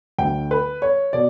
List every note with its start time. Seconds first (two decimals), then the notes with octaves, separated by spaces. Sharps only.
0.19 D2 D3 G5
0.51 B4
0.82 C#5
1.13 B2 D5